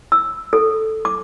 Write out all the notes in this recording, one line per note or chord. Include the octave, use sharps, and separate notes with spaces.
E6
A4
D6